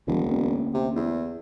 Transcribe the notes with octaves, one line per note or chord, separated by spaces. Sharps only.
E1 D2 E3 G3
D2 A#3 C#4
C3
E2